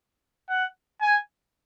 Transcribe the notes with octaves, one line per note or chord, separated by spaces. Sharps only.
F#5
G#5